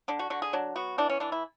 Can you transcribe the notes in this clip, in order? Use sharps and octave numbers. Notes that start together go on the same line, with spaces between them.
D3 D4
F#4
D3 F#4
G#4
F#3 D4
B3 F#4
E3 D4
C#4
E3 D4
E4